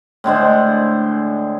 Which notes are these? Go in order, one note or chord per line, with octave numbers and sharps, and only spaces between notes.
A2 D3 G#3 C5